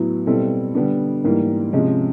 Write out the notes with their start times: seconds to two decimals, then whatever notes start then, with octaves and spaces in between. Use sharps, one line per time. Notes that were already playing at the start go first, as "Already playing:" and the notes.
Already playing: A2 F#3 B3 E4
0.26 B2 G3 C4 E4 A4
0.75 D3 G3 B3 D4
1.24 G#2 E3 G3 A#3
1.73 C3 F3 G#3 C#4